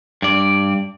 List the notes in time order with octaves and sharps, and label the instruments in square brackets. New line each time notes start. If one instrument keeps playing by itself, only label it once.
[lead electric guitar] G2 D5